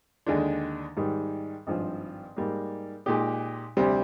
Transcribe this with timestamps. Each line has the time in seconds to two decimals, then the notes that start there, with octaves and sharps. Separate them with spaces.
0.26 D#2 D3 G#3 D4
0.97 G#2 D#3 G3
1.67 G#1 G2 F3
2.37 G#2 G3 A#3
3.06 A#2 G#3 D#4 G4
3.77 D2 C3 G3 C4